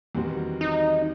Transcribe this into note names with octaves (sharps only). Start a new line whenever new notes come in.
E2 D#3 G3 C4 F#4
D#4